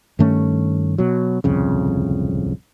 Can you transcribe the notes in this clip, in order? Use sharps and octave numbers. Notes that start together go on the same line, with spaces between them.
G2 D#3 A3 C#4
B2 F#3
D1 C2 F2 C#3